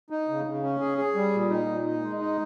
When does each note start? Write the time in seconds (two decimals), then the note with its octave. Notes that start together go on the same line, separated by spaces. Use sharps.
0.10 D#4
0.28 C#3
0.46 C#3
0.63 C#4
0.80 G#4
0.98 G#4
1.15 G3
1.33 A#2
1.49 D#4
1.67 A#2
1.84 D#4
2.02 G#3
2.19 D#4